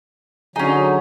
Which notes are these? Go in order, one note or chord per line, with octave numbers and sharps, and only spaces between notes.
D3 F#3 C#4 D#4 G#4